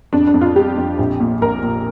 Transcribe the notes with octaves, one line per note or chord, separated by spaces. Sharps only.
F2 D4
D4
F2
F4
G3 G4
F2
A#1
A#2
A#1 A#4
A#2